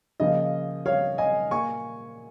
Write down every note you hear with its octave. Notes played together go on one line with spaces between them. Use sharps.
C#3 F3 A#3 D#5
C#5 F5
D#5 G#5
A#2 A#3 G#5 C#6